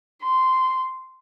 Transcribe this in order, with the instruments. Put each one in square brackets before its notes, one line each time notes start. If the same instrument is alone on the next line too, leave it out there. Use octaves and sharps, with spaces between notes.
[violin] C6